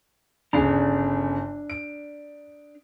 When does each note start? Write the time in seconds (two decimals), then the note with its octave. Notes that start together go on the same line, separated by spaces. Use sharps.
0.53 G1 C#3 D4 D5 A#5
1.70 D7